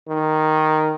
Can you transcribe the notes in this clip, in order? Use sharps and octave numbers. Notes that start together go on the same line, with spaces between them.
D#3